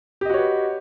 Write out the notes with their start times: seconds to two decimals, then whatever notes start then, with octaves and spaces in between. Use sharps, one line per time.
0.21 G4
0.25 D#5
0.30 F#4
0.34 C#5
0.38 B4